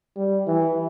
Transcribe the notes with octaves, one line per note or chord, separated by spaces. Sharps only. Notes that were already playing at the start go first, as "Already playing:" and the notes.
G3
E3